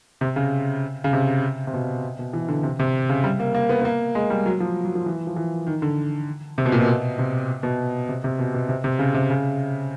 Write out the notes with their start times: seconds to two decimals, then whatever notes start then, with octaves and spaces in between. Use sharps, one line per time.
0.21 C3
0.36 C#3
1.04 C#3
1.13 C3
1.67 C3
1.73 B2
2.19 B2
2.33 E3
2.48 D3
2.63 C3
2.79 C3
3.09 C#3
3.24 G3
3.40 A#3
3.55 A#3
3.69 B3
3.81 B3
3.85 A#3
4.15 G#3
4.30 G3
4.46 F#3
4.60 F3
4.85 F#3
4.95 F3
5.06 E3
5.27 F3
5.36 E3
5.67 D#3
5.82 D3
6.58 C3
6.66 B2
6.72 A#2
6.80 B2
7.18 C3
7.63 B2
8.09 C3
8.24 C3
8.39 B2
8.54 B2
8.69 C3
8.84 C3
8.99 C#3
9.14 C3
9.30 C#3